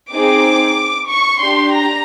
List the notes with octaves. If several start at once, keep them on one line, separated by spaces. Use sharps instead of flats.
C4 D#4 G#4 D6
C#6
D4 G4 C6
A#5